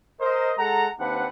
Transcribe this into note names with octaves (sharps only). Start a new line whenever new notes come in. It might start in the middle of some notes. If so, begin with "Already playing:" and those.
A#4 C5 D#5
G#3 A4 F#5 A#5
D#2 C4 D4 B4 F#5